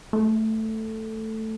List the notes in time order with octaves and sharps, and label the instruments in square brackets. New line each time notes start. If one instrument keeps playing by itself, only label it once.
[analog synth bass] A3